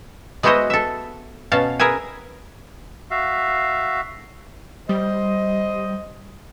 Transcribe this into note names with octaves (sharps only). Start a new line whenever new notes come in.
G#3 B3 E4 F#4 C5 D#5
A4 E5
B2 C#4 F5 A5
G#4 A#4 B4 E5 G#5
F#4 E5 F5
G3 C5 D#5